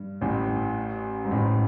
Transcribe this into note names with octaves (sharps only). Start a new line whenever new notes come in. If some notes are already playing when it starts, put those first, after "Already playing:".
Already playing: G2
A1 A2
G#2
A1 A2